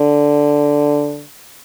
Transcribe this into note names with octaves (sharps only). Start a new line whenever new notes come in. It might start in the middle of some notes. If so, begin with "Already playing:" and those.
Already playing: D3